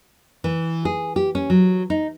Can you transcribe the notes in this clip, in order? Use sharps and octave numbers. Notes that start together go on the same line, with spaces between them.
E3
G#4
G4
C#4
F#3
D#4